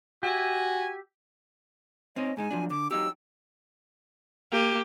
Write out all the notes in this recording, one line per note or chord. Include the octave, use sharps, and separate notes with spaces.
F#4 G4 E5 G#5
C4 C#4 D#4 D#5
G#2 G#3 D#4 G#5
F3 F#3 D4
D3 D6
F#3 D#4 G4 E6
A#3 G4